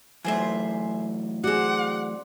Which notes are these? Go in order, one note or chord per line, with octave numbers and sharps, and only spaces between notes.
E3 F#3 A3 G#4 C5 E5
C4 F#4 G#4 D5 F#5